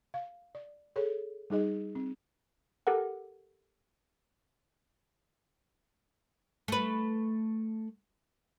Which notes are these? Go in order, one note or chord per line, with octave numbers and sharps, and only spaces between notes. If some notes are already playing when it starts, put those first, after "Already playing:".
F5
D5
G#4 A4 C#5
G3 D#4 G#4 D#5
C4
G4 A4 A#4 F#5
A3 B4